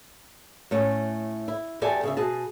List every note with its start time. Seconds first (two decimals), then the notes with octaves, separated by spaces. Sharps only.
0.71 A2 A3 C#4
1.48 E4
1.82 E2 G4 A4 D5 E5 G#5
2.03 C#3 G#4 E5
2.17 B2 G#4 A5